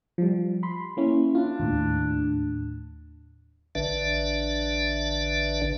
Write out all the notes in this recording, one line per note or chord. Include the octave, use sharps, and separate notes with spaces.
F3 G3
B5 C6
A#3 C#4 E4
D4 F4
D#2 A2
A1 D3 D4 B4 D5 E5